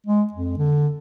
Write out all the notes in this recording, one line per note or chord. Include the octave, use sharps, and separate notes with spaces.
G#3
F2
D3